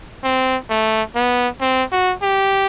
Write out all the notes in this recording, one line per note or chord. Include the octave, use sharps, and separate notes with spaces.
C4
A3
B3
C4
F#4
G4